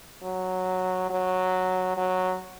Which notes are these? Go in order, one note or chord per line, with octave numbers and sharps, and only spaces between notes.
F#3
F#3
F#3